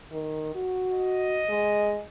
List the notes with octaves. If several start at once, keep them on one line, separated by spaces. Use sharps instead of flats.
D#3
F#4
D#5
G#3